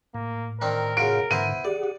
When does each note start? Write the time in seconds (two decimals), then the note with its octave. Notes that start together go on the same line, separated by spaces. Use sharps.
0.14 A2 A#3
0.61 D#3 C4 D4 A#4
0.97 C#3 F4 F#4 D7
1.31 G#2 D3 B3 E4 C5 D#7
1.65 G4 G#4 D5 F#5